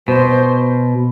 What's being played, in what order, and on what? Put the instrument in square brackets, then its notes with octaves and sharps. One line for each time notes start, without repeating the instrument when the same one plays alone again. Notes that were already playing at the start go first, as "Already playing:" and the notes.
[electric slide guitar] B2 [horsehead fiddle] C5